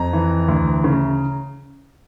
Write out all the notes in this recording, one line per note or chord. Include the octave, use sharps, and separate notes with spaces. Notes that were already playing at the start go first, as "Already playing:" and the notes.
Already playing: F2 A#5
E3
D2
C#3